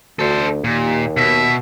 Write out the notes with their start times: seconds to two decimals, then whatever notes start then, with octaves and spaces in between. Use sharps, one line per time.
0.19 D2 A4 C5
0.64 D#2 A#2
1.17 B2 E5